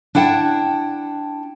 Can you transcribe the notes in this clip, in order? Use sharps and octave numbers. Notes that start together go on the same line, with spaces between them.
D4 E4 F#5 G5 A5